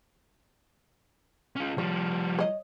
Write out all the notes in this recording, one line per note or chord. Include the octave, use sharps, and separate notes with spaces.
C#4 F4
F3 G3 C#5
C#5 D#5